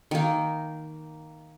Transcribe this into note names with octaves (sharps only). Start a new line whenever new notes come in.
D#3 A#3